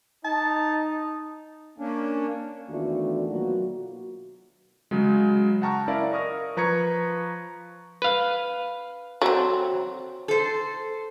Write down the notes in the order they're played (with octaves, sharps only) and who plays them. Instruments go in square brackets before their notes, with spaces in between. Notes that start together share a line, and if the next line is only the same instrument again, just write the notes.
[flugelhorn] D#4 [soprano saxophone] A5
[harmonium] A#3 C#4 D4
[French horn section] E2 D#3 A3 D4 F4 F#4
B2 F#3 A#3 F4 F#4
[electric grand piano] C#3 F#3 G#3
F#5 G5 A5 A#5 C#6 F6
C#4 E4 A#4 D5 E5 F5
A#4 D#5 C#6 D#6 F6 A#6
F3 B4 A#5 C#6 G#6 C#7
[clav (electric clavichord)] B4 F5
[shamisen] F#3 C4
[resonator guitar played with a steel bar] A4 C5